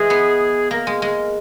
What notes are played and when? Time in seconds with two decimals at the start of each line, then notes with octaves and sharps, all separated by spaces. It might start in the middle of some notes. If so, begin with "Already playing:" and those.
Already playing: E3 G#3 G#4
0.10 B3
0.71 A#3 A#4
0.87 G#3
1.02 G#3